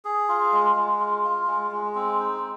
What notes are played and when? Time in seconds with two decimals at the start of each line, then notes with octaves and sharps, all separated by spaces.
0.05 G#4
0.29 F4
0.53 G#3
0.76 G#3
1.00 F4
1.24 F4
1.47 G#3
1.71 G#3
1.95 C4
2.19 D#4